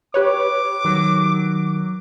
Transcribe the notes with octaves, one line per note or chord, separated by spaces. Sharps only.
G4 B4 C#5 D6
D#3 F#3